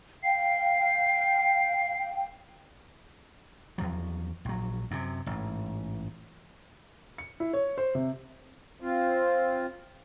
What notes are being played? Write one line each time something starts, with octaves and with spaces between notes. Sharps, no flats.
F5 G5 C7
E2 F3 F#3
A#1 F#3
F#2 C3
A1 G#2
C#7
E4
C#5
C5
C3
C4 F4